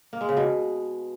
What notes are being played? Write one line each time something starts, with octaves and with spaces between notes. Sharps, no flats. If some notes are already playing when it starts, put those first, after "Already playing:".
A#3
G#3
C#3
B2